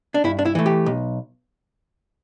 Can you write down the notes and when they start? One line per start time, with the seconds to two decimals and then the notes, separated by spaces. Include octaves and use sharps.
0.14 D4
0.24 G2 E4
0.39 D4
0.45 E4
0.55 E3 A3
0.66 G4
0.86 B1